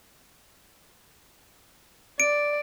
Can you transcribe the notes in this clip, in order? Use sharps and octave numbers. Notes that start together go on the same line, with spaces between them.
D5 D7